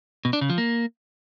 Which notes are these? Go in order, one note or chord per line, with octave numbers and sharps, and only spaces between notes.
B2
D4
C#3
F3
A#3